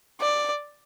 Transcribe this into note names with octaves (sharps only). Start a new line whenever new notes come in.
D5